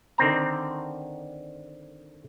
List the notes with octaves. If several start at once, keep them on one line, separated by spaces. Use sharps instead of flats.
D3 D#3 C4 A#5